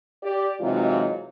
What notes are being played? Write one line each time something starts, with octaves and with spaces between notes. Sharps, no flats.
G4 D5
C3 E3 F#3 G#3 D#4 F4